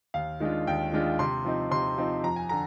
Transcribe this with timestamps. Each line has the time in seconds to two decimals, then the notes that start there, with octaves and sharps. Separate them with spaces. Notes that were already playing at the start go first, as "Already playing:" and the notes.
0.14 D#2 F5
0.40 D#3 G#3 D4 F4
0.67 D#2 G5
0.92 D#3 G#3 D4 F4
1.19 C3 C6
1.45 F3 C4 D#4
1.71 C3 C6
1.98 F3 C4 D#4
2.23 F2 A#5
2.36 G#5
2.49 D3 A#5